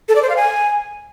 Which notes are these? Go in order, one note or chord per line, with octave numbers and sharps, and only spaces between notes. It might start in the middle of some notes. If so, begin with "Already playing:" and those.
A4
D5
C5
F5
G#5